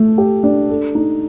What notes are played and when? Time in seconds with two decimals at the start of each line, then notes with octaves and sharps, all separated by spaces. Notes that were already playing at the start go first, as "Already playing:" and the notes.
Already playing: A3
0.18 G4
0.43 D4
0.69 A4
0.95 D#4